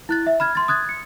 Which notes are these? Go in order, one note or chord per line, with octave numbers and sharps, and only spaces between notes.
E4 F#6 A6
E5
B5 F6 G#6
C6 A6
D#6 F#6 G#6 A6
C#7